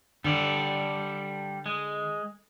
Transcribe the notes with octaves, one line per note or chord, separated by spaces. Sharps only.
D3 G3 A4 D5
G#3